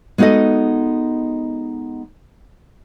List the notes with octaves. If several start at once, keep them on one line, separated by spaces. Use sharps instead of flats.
G#3 B3 D#4 F#4 A4 D#5